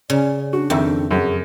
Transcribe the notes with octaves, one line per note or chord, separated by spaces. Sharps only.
C#3 D5
D4 F#4
F2 D#3 E5 E6
F#2 G#4